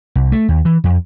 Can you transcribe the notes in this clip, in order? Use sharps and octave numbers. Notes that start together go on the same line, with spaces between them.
C2
A3
D#2
E3
F2